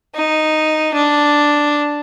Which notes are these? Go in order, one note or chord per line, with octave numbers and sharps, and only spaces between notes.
D#4
D4